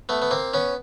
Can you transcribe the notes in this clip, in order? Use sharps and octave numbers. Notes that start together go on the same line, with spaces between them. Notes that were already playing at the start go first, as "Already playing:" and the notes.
A3 B3
B3
A#3 C4
B3 C#4